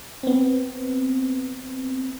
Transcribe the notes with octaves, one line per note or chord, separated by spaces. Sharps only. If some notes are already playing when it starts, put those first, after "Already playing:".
B3 C4